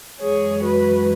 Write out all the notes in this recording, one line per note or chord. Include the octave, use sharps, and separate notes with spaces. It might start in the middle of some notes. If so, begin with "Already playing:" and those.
F#2 E3 G#3 G#4 C#5
F#4 B4